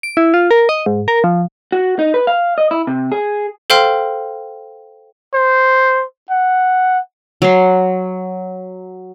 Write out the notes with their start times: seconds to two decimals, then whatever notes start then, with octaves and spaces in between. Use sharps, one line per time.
0.03 D7
0.17 E4
0.34 F4
0.51 A#4
0.69 D#5
0.86 G#2
1.08 A#4
1.24 F3
1.72 F#4
1.99 D#4
2.14 B4
2.27 F5
2.58 D#5
2.71 E4
2.87 C3
3.12 G#4
3.70 A4 C5 F5 G5 C6 F6
5.34 C5
6.30 F#5
7.42 F#3 C6